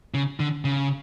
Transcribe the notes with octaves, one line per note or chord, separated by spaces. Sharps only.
C#3
D3
C#3